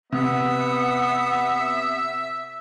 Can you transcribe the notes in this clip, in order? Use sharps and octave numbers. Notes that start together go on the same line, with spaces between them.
C3 B3 E5 F#5 D#6